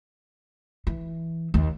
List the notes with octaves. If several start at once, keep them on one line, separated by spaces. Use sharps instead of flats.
E3
D#2